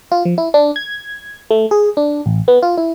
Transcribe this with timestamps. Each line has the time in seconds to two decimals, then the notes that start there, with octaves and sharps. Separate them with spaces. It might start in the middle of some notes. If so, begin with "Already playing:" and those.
0.12 F4
0.25 F3
0.38 E4
0.54 D4
0.76 G#6
1.51 A3
1.71 G#4
1.97 D4
2.26 A1
2.48 B3
2.63 F4
2.78 E4